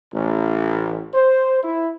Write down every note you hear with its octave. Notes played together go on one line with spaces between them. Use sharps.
A1
C5
E4